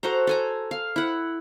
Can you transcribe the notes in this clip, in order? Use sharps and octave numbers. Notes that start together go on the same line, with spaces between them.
F#4 A4 C5 A#5
A4 G#5 A#5
F5
E4 F#5